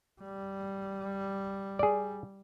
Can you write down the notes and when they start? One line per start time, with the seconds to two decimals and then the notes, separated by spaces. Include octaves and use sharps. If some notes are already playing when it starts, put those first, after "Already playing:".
0.22 G3
1.79 G#4 D5